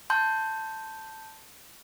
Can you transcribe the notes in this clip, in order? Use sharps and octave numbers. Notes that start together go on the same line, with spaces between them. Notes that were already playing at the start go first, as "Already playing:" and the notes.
A5 C6 G6